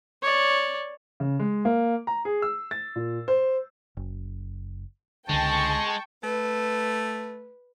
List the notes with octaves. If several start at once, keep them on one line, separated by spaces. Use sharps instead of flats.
C#5 D5
C#3
G#3
A#3
A#5
G#4
E6
A6
A#2
C5
F#1
C#2 D3 G#3 G5 A5 C#6
A3 B4